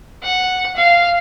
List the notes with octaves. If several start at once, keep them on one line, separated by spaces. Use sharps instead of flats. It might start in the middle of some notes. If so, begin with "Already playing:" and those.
F#5
F5